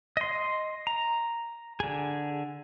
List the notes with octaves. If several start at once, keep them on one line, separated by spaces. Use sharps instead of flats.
D#5 C6
A#5
D3 G#4